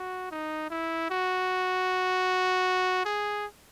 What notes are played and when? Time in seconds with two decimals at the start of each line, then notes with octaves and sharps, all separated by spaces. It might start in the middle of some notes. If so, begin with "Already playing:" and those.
Already playing: F#4
0.31 D#4
0.70 E4
1.10 F#4
3.05 G#4